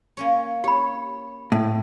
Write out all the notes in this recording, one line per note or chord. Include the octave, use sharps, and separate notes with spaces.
A#3 C#4 C#5
G4 C#5 B5
A2